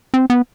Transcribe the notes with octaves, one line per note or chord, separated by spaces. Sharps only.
C4
B3